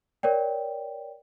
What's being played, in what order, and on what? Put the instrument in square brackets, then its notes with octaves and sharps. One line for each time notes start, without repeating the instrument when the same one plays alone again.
[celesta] A#4 C#5 D5 G5